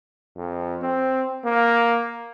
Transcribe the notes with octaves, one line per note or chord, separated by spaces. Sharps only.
F2
C4
A#3